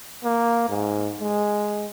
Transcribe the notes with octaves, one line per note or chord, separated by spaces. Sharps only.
A#3
G#2
G#3